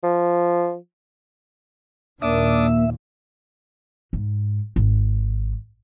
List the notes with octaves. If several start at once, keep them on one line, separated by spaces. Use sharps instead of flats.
F3
D#2 A#2 A#3 D4 E5 D6 D#6
G#2
G#1